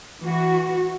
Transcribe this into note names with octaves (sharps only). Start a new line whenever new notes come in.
E3 F#4